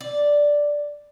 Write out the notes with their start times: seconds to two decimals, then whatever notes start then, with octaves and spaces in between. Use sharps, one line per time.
0.01 D5